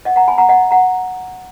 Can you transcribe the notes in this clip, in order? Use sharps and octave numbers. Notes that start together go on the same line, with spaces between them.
D#5 F#5
F#5 A#5
G#5 B5
F#5 A#5
D#5 F#5
F#5 A#5